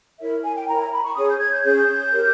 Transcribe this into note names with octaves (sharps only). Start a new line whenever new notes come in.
E4 A#4 C#5 E5
G#5
G5
E4 A#4 C#5 A#5
A#5
B5
C#6
C#4 G#4 C#5 D#6
G6
G#6
G6
C#4 G#4 C#5 G6
G4 A#4 C#5